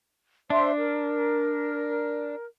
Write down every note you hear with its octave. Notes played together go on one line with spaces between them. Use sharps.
D4 C5 E5 C6
A#4